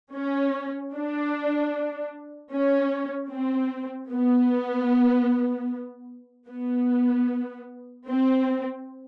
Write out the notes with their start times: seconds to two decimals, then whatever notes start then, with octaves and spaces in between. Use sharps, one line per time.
0.14 C#4
0.94 D4
2.52 C#4
3.31 C4
4.10 B3
6.49 B3
8.07 C4